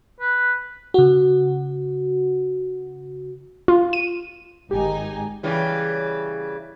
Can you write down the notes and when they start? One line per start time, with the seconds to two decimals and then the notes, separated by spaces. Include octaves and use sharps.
0.20 B4
0.94 C#3 F#4
3.68 F4
3.93 D#7
4.71 G#1 D#4 G4 G#5
5.43 C#3 E3 G3